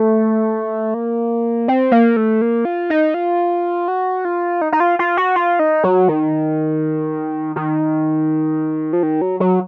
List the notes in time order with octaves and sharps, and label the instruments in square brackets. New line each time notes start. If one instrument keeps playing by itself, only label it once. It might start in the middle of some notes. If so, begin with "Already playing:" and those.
Already playing: [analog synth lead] A3
A#3
C4
A#3
A3
A#3
F4
D#4
F4
F#4
F4
D#4
D#4
F4
F4
F#4
F4
D#4
F#3
D#3
D#3
F3
D#3
F#3
F#3